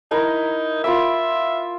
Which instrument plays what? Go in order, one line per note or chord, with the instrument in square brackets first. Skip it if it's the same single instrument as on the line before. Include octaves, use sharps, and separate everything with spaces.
[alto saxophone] D#4 [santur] E4 A#4
[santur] F4 B5 D6 [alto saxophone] E5